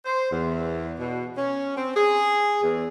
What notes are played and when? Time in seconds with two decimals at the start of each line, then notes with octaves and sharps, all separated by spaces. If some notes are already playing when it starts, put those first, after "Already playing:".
0.05 C5
0.31 E2
0.99 B2
1.36 C#4
1.77 C4
1.95 G#4
2.63 E2